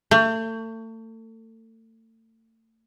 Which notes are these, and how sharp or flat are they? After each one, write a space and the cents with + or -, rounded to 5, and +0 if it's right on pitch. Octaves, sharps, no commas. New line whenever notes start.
A3 +35